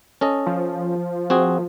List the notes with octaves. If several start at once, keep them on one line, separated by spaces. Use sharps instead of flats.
C#4 A4 D#5
F3
C4 F#4 G#4